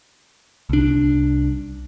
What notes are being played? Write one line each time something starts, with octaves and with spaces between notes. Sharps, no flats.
C2 D4